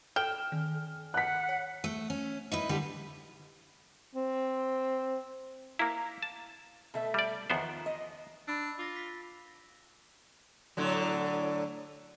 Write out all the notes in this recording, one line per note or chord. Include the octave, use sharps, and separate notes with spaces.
A4 G5 F6 E7
D#3
F#5 F#6 B6
C#5
A3
C#4
D#4 E4 B4
D3 G3 G4 B4
C4
A#3 E4 F5 A#5
A5
B2 A3 E5
G3 D5
E2 D#3 F3 B3 C5
D#5
D4 B5 E6
F4 D6 A6 A#6
B6
A2 D3 F#3